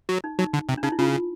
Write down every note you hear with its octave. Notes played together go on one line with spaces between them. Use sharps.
F#3
D#4
F#3 D#4
D3
C3
D4
C#3 D#4
E4
C#3 F4